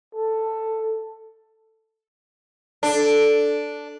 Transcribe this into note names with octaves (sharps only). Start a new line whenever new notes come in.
A4
D4 A4